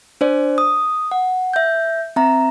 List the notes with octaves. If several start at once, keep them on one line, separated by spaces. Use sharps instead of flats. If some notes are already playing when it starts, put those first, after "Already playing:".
D4 C5 D5
D#6
F#5
E5 G6
C4 E5 A#5